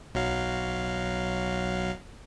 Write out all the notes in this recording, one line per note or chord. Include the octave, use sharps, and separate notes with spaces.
B1 F#3 F5